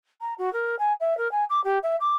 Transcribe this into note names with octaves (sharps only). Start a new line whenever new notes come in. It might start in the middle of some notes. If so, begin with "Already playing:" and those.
A#5
F#4
A#4
G#5
E5
A#4
G#5
D6
G4
E5
D6